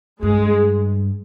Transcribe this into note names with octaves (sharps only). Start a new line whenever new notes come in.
G2 G#3